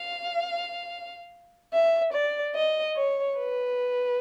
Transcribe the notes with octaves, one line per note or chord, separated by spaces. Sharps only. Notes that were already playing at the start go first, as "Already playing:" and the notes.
Already playing: F5
E5
D5
D#5
C#5
B4